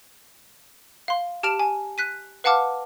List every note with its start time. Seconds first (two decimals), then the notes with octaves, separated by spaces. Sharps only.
1.08 F5 C6
1.43 G4 A5 F6 D7 E7 F7
1.59 G#5
1.98 F#6 B6 D#7
2.44 B4 F5 F#5 A5 D6 F6